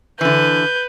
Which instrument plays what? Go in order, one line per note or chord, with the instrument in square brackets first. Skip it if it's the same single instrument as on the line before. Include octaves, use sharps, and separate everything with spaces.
[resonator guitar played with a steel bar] D3 E3 [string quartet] B4 [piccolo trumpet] G6